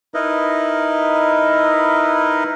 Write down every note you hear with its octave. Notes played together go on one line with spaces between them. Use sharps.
D#4 E4 A#4 B4 D#5